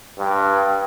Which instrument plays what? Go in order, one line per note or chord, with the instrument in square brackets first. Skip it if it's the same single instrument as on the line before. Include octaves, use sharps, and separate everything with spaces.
[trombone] G2 [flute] G5